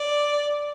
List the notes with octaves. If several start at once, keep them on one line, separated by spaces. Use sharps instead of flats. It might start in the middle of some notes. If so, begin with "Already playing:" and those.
Already playing: D5